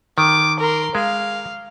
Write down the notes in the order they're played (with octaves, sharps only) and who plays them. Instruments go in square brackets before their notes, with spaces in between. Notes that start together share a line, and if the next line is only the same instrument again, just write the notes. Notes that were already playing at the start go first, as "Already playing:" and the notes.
[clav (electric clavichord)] D#3 [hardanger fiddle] D6
[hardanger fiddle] A#4 C6
[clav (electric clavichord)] G#3 [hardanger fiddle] F5